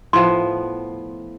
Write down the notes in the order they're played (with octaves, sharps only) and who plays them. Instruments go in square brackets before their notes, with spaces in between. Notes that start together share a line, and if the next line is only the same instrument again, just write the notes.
[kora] A2 F3 B3 [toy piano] C6